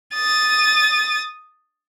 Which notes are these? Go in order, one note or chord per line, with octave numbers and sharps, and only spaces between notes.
D#6 A6